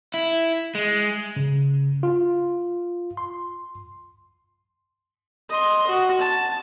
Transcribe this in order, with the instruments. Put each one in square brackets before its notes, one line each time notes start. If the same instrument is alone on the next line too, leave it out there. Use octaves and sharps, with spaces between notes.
[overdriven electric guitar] E4
G#3
[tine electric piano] C#3
F4
C6
[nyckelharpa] D#5 C6
F#4
A5